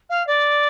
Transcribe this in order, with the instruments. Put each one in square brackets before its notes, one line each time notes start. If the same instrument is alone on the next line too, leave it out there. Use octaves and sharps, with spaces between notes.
[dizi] F5
D5